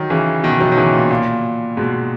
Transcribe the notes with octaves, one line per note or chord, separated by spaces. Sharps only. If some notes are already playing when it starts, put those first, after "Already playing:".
Already playing: D#3 F#3
C#3 E3
B2 D#3
D#3 F#3
D#3
C#3 E3
A#2
A#2
G#2 B2